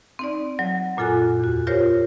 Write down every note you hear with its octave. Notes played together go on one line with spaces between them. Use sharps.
C4 D#4 D5
F#3
F#2 A#2 F4 A4 G#5 F#6
E2 F#4
F4 G4 A#4 C5 C#5